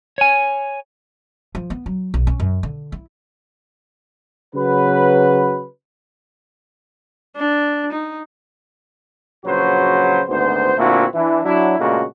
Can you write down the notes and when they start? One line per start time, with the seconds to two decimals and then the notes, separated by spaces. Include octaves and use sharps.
0.18 C#5 G#5
1.55 F3
1.70 B3
1.86 F#3
2.14 B1
2.27 C#4
2.40 F#2
2.63 D3
2.92 E4
4.55 C#3 F#3 B4
7.36 D4
7.92 D#4
9.45 A#1 C#3 F#3 F#4 B4 C5
10.29 G#1 D2 B3 C5
10.78 A#2 D3 A3 C4 E4 F#4
11.14 E3 D4
11.45 F#3 D4 E4
11.79 A#2 C#3 G#3 A3 D4 F#4